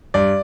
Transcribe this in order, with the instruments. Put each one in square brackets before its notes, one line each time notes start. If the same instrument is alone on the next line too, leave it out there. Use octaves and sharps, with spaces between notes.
[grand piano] G2 D5